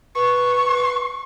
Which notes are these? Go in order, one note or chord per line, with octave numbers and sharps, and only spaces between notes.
B4 C#6